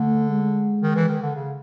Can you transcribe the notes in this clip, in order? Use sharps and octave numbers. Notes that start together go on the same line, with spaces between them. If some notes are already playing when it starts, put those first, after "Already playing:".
Already playing: D3 A3
G#3
D#3
E3
D#3
D3
C#3